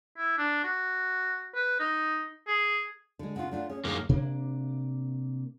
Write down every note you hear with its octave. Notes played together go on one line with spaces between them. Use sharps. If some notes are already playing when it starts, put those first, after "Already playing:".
E4
D4
F#4
B4
D#4
G#4
D3 G#3
C#3 F4 F#5
A3 D4 F4 F#5
C#4 G#4
F#2 D#3 A#3 G#4
C3 A#3 D4